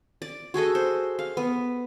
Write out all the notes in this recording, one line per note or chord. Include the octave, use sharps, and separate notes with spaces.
D5
F#4 G#4 A4 D#5
C5
F5
B3